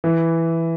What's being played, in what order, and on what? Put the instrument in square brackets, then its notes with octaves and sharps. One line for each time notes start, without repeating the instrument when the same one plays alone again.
[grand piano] E3